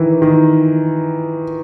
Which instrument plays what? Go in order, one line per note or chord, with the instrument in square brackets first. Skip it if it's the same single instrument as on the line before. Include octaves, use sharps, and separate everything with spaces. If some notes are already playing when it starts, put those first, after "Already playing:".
Already playing: [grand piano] D#3 E3
D#3